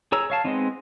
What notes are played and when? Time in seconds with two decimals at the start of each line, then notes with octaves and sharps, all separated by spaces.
0.12 G#4 C#5 A#5 E6
0.30 C#5 F5 A5
0.45 G#3 B3 C4 D#4